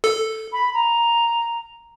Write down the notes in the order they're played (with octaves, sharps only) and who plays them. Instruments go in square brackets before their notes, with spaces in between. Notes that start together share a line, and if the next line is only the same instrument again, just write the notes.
[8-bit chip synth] A4
[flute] B5
A#5